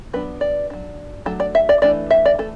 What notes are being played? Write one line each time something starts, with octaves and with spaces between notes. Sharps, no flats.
F#3 B3 D4 B4
D5
F#3 D4
F#3 A3 D4 A4
D5
E5
D5
E3 A3 D4 D5
E5
D5
E3 A3 A4